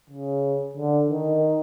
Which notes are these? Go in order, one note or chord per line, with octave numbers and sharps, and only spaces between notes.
C#3
D3
D#3